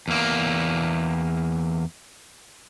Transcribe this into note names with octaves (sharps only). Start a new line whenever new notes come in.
E2 A#3